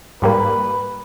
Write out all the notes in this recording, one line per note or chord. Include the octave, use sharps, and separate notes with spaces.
G#2 G3 A#3 B4